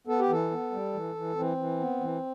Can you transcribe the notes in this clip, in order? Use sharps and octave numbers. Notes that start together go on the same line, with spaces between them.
B3 A4
G4
E3 A4
B3
G3
E3
E3
E3 C4
E3
B3
E3